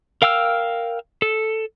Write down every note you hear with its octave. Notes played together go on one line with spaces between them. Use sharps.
A#4 F5 G5 E6 F6
A4